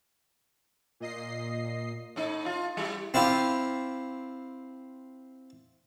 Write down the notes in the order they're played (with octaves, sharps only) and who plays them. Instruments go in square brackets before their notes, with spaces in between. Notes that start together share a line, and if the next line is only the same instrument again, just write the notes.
[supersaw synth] A#2 D#5 C7
[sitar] A2 D#4
F4
G3 E4 G4
[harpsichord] C4 E4 F4 G4